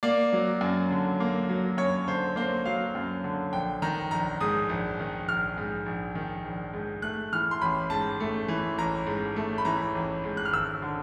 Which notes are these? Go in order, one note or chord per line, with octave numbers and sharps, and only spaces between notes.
A#3 D5
F#3
F#2
D3
A#3
F#3
F#2 C#5
D3 C5
A#3 C5
F#3 F5
F#2
D3
A#1 G5
D#3 A#5
A#1 A#5
G#2 D#6
A#1
D#3
A#1 F6
G#2
A#1
D#3
A#1
G#2
A3 F#6
E3 F6
C6
A1 B5
G#2 A5
A3
E3
A1 A#5
G#2
A3
B5
E3 A#5
A1
G#2
F#6
F6
G#1 E6
D3